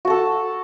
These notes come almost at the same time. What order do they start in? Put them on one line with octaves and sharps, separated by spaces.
F#4 A5 A4